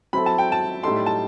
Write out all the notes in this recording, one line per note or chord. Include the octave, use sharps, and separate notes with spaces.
F#3 C4 E4 A4 B5
A5
G5
A5
A2 G3 D#4 A4 C6
A5